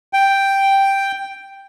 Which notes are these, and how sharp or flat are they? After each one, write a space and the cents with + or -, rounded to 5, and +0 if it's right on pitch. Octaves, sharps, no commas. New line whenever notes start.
G5 +0